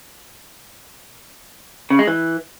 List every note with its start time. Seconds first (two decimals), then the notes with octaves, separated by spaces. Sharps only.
1.90 C#3
1.99 G#3
2.07 E3